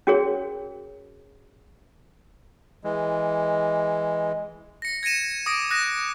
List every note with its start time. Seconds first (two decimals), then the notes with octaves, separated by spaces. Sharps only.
0.07 C#4 F#4 G#4 A#4 C#5
2.84 E3 G#3
4.82 A#6 C#7
5.03 G#6 A#6 C#7 D#7 E7
5.46 D6 D#6 A#6 D7
5.70 D#6 F#6 A#6 E7